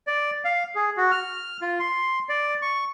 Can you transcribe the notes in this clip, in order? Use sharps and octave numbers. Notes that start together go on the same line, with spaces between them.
D5
F5
G#4
F#4
F6
F4
C6
D5
C#6